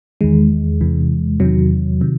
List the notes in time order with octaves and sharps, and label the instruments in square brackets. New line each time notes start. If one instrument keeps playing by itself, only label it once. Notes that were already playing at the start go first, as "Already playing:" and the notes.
[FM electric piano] E2 D#3 G#3
E2 C3 E3
E2 C3 D#3 F#3
C3 D#3